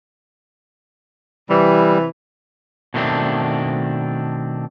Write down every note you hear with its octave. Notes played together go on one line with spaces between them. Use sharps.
C3 E3 G3
B2 D#3 A3 C4 D4